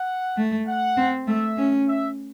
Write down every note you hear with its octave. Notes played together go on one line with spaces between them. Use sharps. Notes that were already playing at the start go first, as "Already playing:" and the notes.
Already playing: F#5
A3
F#5
C4
A3 E5
C#4
E5